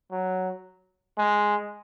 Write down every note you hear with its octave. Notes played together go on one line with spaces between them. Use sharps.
F#3
G#3